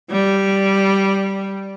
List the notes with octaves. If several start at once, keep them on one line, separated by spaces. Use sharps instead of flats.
G3